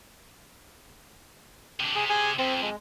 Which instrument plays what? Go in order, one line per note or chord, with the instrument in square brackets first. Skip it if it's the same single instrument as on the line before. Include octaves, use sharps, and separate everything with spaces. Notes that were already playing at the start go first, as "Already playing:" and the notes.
[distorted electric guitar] C3 D4
[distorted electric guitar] C3 [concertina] G#4
[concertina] G#4 G#5
[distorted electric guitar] F2 [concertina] C4
[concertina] G#3